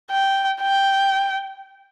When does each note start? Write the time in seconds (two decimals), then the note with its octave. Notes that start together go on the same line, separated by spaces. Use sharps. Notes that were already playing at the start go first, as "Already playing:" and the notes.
0.11 G5
0.61 G5